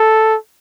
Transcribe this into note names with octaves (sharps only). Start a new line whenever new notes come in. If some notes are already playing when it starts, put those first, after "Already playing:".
Already playing: A4